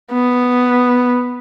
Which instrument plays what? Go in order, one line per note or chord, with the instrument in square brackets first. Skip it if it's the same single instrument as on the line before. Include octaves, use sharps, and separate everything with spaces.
[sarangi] B3